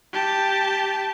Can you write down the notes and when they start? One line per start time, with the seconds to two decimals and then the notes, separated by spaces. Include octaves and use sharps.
0.13 G4 A5